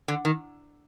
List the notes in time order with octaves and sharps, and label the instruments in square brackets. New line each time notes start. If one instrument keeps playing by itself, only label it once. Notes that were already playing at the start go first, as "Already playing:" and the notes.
[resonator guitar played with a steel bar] D3
D#3